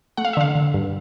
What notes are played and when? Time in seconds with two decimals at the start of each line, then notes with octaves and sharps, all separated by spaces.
0.17 A3 F#5
0.25 F5
0.33 E5
0.37 D3 F5
0.55 D3
0.74 G2